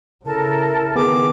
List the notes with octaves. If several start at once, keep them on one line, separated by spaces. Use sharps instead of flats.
C#3 E4 A4 A#4 A5
D#3 B3 G#4 D6